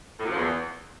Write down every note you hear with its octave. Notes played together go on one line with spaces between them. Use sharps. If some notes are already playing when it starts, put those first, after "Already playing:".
A2
F#2
F3
E2